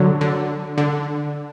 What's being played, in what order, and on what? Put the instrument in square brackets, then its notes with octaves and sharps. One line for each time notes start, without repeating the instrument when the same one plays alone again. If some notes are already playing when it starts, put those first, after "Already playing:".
Already playing: [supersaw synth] D3 F#3
D3
D3